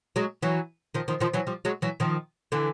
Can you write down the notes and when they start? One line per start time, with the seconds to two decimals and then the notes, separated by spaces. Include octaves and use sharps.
0.16 F#3 G#3
0.42 E3 F#3
0.94 D#3 F3
1.08 D#3 F3
1.20 D#3 F3
1.34 E3 F#3
1.47 F3 G3
1.65 F#3 G#3
1.82 E3 F#3
2.00 D#3 F3
2.52 D3 E3